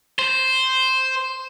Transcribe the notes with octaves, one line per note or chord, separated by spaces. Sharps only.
C5